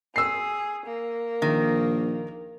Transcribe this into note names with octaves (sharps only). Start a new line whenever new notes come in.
G#4 E6 C7
A#3
A#1 D#3